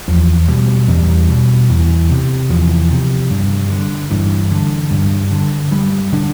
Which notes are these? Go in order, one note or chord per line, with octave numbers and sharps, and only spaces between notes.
E2 F3
B2 G3
E2 G3
B2
E2
C3
E2 F3
C3
G2
D3
G2 E3
D3
G2
D3
G2 G3
D3 D4